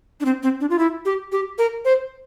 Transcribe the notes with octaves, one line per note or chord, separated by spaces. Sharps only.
D4
C4
C4
D4
F4
E4
G4
G4
A#4
C5